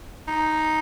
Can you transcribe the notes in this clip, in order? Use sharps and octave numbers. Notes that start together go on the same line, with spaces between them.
D#4